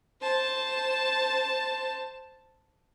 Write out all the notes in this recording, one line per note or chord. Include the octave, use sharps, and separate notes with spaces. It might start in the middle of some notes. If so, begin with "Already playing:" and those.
C5 A5